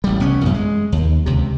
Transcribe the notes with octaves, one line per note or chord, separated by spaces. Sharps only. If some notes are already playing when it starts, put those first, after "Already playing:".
A1 G3
C2 B3 C#4
A1 F#2
G#3
D#2
C#2 C3